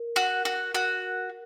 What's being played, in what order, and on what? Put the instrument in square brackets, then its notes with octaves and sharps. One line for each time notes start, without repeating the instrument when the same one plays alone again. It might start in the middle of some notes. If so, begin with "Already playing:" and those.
Already playing: [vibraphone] A#4
[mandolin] F#4
F#4
F#4